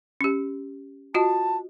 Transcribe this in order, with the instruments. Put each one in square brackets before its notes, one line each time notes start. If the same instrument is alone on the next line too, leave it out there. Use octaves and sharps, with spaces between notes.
[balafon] C#4 G4
[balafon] F4 F#4 D#5 [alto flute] A5